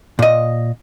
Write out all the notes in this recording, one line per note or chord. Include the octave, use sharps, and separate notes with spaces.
A#2 D#5